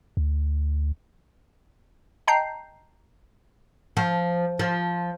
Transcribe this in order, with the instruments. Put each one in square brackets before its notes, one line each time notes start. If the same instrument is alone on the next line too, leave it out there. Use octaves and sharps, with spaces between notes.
[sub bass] D2
[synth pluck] D#5 G5 A5 A#5 G6 C7
[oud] F3
F3